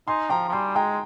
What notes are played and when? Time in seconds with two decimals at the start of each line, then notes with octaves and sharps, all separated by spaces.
0.08 D#4 G#5 C6
0.30 F3 G5 A#5
0.49 F3
0.52 G3 G#5 C6
0.75 G#3 G5 A#5